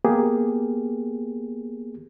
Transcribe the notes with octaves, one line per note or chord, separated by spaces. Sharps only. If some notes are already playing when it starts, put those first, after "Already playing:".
A#3 B3 G4 G#4